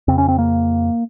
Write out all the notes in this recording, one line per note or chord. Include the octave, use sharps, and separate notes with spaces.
F2 C#3 C4
C#4
C4
A#3